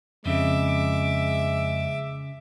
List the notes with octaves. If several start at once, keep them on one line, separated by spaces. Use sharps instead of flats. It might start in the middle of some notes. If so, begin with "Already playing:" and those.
F2 C#3 G#3 E5 D6